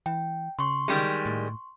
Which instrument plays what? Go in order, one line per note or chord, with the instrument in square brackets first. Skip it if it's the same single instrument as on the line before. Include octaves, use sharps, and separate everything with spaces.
[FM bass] E3 [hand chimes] G5
[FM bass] C#3 [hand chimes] C6 C#6
[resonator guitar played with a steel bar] D#3 G3 G#3
[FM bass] A2